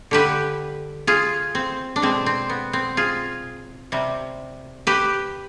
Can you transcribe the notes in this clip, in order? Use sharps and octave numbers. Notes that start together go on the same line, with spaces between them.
D3 G3 G4 B4
F4 G#4
C4
D4
B2 G#3 C4
C4
B3
C4
F4 G#4
C3 G3
G4 B4